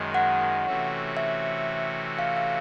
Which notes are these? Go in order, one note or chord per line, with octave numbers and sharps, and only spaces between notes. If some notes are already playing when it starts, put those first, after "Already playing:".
Already playing: F#2 D#3 G#3
F#5
C3 E3 A3 C#4 F#4
E5
F5
F5